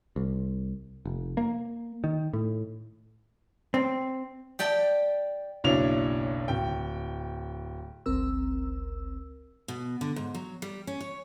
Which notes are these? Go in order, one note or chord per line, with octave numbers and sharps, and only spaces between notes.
C2
F1
A#3
D#3
A2
C4
G4 D5 G5 A5
F#1 B1 D4 E4 C#5 F7
D1 G5
G1 C#2 C4 A#4 E6
B2
D3
G#2
F#3
G3
C#4
C#5